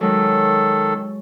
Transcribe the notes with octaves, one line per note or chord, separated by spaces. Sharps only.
D#3 F#3 G#3 A4